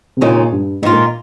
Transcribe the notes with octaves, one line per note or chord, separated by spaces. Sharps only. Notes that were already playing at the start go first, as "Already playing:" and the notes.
C3
D#2 A#2 C#3 G#3 D#4
G2
G#2 D#3 A#3 F4
A#2